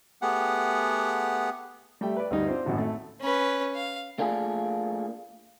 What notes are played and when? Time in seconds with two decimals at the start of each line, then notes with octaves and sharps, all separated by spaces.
0.22 A3 B3 G4 G#4 F#5
2.01 G3 A3 E5 G5
2.16 B4 D5
2.31 D2 G2 D#4 D#5
2.47 C4 D4 F4 C5
2.65 G#1 F#2 A2 F#4
2.78 A3
3.21 C#4 B4
3.75 F5
4.18 A3 A#3 D4 F4 G#4